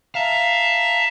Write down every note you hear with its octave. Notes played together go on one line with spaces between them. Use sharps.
E5 F5 A5 A#5